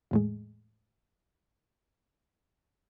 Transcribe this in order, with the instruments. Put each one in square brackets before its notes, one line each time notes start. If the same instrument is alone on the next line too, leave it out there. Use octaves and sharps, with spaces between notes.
[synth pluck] E2 A2 G#3